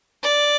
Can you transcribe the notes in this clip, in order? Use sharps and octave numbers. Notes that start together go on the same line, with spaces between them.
D5